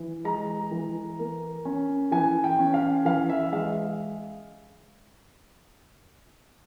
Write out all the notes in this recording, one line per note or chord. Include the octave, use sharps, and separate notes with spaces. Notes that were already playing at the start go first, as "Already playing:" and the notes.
Already playing: E3
G#3 A#5
E3
A#3
C#4
E3 G#5
G5
C#4
F5
E3 F5
E5
G#3 F5